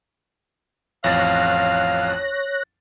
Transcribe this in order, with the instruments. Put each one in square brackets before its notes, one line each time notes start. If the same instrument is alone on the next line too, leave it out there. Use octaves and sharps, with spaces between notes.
[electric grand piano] A1 F2 A6 [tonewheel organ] C#5 F#6 A#6 [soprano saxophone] F5